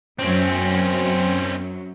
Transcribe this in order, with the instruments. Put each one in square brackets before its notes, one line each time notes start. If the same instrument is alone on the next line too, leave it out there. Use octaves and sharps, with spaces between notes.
[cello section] F#2 F#3 [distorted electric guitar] C4 C#4